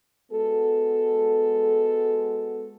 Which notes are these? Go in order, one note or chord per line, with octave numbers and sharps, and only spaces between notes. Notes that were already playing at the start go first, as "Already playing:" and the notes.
G#3 B3 F#4 A4